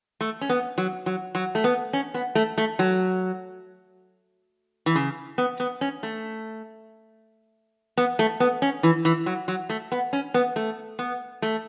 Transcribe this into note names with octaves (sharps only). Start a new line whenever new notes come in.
A3
C#4
B3
F#3
F#3
F#3
A3
B3
C#4
B3
A3
A3
F#3
E3
C#3
B3
B3
C#4
A3
B3
A3
B3
C#4
E3
E3
F#3
F#3
A3
B3
C#4
B3
A3
B3
A3